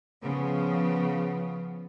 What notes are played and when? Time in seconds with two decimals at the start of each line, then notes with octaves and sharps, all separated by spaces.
0.22 C#3 F3 B3